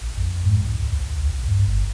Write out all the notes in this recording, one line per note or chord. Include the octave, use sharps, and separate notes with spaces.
A#1
F2
G#2
C2
D2
B1
D2
B1
G2
G1